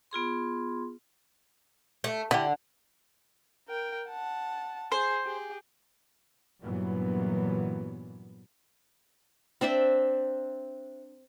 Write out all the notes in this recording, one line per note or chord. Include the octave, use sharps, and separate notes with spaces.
B3 F4 G#4 C6
A3
D3 E4 G4
A#4 G5
F#5 A5
G#4 C5
G4 G#4
G2 A#2 E3 F#3 B3
C4 D4 C5 E5